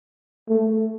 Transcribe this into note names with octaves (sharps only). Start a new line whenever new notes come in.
A3